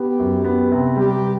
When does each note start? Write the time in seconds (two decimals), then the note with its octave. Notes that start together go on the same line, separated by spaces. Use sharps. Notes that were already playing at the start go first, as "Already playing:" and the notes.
Already playing: B3 G4
0.19 F#2
0.44 B3
0.71 C3
0.97 G3 G4